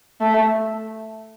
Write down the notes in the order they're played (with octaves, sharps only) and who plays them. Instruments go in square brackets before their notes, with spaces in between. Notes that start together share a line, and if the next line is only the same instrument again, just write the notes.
[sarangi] A3